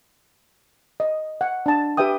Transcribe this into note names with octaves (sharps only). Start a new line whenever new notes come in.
D#5
F#5
D4 A5
G4 B4 E5 G5 D#6